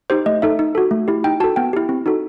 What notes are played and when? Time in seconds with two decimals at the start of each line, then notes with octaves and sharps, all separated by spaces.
0.10 D#4 G4 C5
0.26 A3 D#5
0.42 D#4 A4 E5
0.59 D#4
0.75 F#4 A4
0.91 A3
1.08 E4 G4
1.24 D#4 G5
1.40 F#4 A4 A5
1.56 B3 G5
1.73 E4 G4
1.89 C4
2.06 D#4 F#4 A4